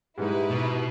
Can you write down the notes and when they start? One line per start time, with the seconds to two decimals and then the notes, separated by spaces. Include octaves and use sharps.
0.18 G#2 G3 D#4 E4 G4 B4
0.51 B2